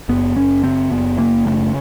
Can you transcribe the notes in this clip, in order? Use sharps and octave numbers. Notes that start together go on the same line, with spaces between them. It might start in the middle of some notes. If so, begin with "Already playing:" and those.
F#1 B3
F#1 C#4
C#3 C4
F#1 B3
C#3 A#3
F#1 A3